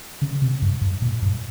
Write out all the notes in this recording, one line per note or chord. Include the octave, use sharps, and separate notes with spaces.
C#3
C3
G2
G2
A#2
G2